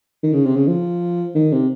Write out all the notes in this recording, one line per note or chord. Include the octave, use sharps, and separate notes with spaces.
D#3
C#3
C3
C#3
F3
D#3
C3